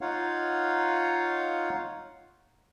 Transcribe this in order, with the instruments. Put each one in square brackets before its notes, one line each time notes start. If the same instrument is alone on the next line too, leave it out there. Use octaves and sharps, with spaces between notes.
[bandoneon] D#4 F4 C#5 F5 F#5